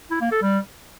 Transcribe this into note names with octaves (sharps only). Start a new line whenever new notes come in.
E4
A#3
A4
G3